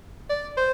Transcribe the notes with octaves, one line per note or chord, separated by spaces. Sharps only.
D5
C5